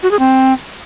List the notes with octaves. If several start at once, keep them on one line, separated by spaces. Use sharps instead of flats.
F#4
G#4
C4